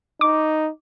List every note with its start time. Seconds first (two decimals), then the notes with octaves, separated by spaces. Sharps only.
0.21 D#4 D6